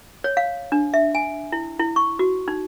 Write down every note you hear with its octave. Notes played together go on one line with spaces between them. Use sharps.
C#5
F5
D4
E5
G#5
E4
E4
C#6
F#4
D#4